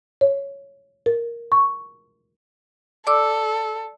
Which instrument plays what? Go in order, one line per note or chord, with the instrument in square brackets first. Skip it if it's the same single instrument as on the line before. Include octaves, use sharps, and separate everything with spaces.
[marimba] C#5
A#4
C#6
[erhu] A4 [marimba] D5 D6 E6